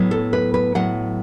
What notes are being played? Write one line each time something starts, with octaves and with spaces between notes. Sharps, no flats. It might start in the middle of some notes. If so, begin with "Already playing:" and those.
Already playing: A2 F#3 B3
A4
B4
B4
A2 F#3 B3 F#5